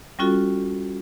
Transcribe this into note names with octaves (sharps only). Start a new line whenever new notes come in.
G3 C#4 F4 F#4 A4